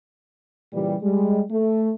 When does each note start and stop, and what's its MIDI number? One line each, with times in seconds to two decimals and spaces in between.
0.73 0.95 46
0.73 0.95 49
0.73 0.95 52
0.73 0.95 55
1.02 1.42 55
1.02 1.42 56
1.51 1.92 57